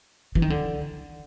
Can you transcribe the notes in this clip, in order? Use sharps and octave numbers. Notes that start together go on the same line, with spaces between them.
E3
D#3
D3